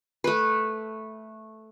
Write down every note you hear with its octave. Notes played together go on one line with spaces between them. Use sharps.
A3 B4